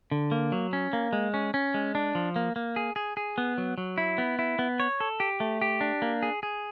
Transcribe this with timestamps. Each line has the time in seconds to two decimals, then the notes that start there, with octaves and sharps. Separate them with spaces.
0.11 D3
0.32 A#3
0.52 F#3
0.73 C#4
0.93 A#3
1.13 G#3
1.34 C#4
1.54 C#4
1.74 G#3
1.95 D4
2.15 F3
2.36 A#3
2.56 A#3
2.76 G#4
2.96 G#4
3.17 G#4
3.38 B3
3.58 F#3
3.78 F#3
3.98 E4
4.18 B3
4.39 E4
4.59 B3
4.80 C#5
5.00 A4
5.20 G4
5.40 A3
5.61 G4
5.81 D4
6.02 A#3
6.23 G#4
6.43 G#4